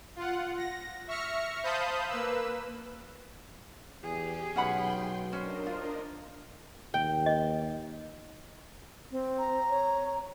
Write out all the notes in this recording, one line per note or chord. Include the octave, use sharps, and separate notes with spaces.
F4 F#5
A#6
E5 C#6 F6 A#6 C#7
C5 F5 A5 B5 D#6 G6
A#3 B4 E6
E2 G4 G#4
B1 C#4 F#5 G5 B5 C6
C#4 D4 A#4 C5 D#5
F4
D#2 G5
D#5
C4
A#5
C#5